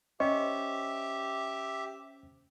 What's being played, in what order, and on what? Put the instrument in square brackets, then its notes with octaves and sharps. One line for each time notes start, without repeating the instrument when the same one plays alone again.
[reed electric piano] C#4 C5 C#6 [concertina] G4 E5 [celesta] D#5